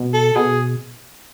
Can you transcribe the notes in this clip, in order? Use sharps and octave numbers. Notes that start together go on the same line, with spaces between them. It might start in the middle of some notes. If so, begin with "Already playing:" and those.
Already playing: B2
A4
B2 G#4